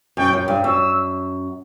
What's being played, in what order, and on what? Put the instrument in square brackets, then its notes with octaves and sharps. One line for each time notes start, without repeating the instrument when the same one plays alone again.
[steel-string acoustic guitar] F#2 [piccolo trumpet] G5
[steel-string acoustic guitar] F#2
G2
[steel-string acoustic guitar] F#2 [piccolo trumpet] E6